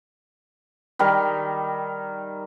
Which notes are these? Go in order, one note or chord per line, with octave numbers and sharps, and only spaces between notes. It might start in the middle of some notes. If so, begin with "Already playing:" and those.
D#3 G3 A#4